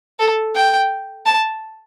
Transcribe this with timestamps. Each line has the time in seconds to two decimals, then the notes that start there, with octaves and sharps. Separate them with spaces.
0.19 A4
0.55 G5
1.26 A5